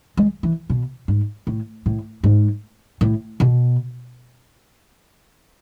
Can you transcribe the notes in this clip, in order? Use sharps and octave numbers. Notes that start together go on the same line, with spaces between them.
G#3
E3
B2
G#2
A2
A2
G#2
A2
B2